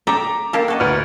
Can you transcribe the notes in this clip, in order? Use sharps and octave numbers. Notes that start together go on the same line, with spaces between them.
A4 E5 G5 A#5 D6
A#3 G4 A4
F#4 A4 D#5
D2 B4 F6